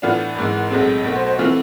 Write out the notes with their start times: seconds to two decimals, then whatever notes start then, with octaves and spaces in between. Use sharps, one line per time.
0.02 A2 E3 B3 D4 F4
0.36 G#1 G#2 E3
0.70 B1 A2 G#3 C4
1.04 B1 B2 A3
1.16 C5
1.26 C5
1.38 E3 A3 C4 F4